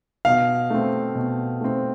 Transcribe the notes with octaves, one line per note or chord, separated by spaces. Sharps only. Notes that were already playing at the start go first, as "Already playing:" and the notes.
B2 F5
A3 C4
B2
A3 C4